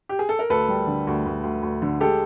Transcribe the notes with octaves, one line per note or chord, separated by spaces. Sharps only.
G4
G#4
A4
A#4
D2 A4 B4
G3
D3
D2
D2
D2
D2
D3
G#3 G4 A4